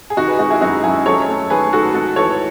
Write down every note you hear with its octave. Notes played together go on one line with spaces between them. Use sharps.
G#4
D#3 D#4 F#4
G#4 B4
G#3 D#4 F#4
E4 G#4
F#2 D#4 F#4
F#2 E4 G#4
F#3 A4 C#5
A3
D#3 G#4 B4
G#2 F#4 A4
G#3 F#4 A4
E3 A4 C#5